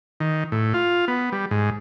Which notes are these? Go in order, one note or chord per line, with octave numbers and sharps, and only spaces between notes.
D#3
A2
F4
B3
G3
G#2